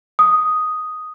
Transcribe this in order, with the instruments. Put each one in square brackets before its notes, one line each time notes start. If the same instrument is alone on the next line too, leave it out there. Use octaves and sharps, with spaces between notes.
[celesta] D#6